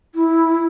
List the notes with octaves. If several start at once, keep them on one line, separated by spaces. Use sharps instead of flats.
E4